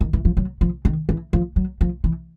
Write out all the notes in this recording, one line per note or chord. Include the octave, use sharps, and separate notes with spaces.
D#3
E3
F3
F#3
F3
D#3
E3
F3
F#3
F3
E3